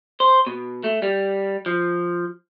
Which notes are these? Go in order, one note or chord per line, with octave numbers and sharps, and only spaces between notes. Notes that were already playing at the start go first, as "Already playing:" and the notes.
C5
B2
A3
G3
F3